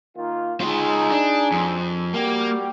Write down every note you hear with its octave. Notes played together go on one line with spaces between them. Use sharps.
D#3 A#3 F4
G#3 D#4 F4 G#4
D4
F2
G3 A#3 F#4 G4